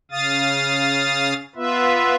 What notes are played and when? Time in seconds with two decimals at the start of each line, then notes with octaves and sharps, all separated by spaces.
0.11 C#3 F5 D#6 A6
1.55 B3 F4 B4 E5